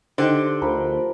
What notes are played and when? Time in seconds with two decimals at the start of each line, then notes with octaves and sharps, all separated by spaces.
0.18 D3 D#4 G4 C5
0.62 D2 F3 A#4 B5